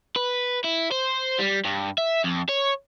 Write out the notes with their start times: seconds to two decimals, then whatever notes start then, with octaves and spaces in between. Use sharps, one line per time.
0.16 B4
0.64 E4
0.92 C5
1.39 G3
1.65 G2
1.98 E5
2.24 F2
2.49 C#5